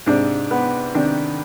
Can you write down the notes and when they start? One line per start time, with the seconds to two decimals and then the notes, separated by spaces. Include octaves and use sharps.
0.06 G#2 C3 D4
0.51 B3
0.94 C3 D#3 D4